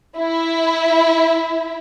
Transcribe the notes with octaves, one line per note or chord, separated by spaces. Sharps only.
E4